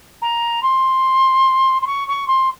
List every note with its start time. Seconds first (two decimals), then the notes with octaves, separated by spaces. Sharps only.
0.22 A#5
0.63 C6
1.82 C6
1.86 C#6
2.08 C#6
2.27 C6